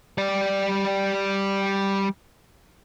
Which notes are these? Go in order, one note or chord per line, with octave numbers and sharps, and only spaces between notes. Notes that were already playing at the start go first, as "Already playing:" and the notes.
G3 D5